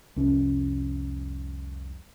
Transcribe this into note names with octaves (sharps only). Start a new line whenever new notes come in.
C2 F2 C#4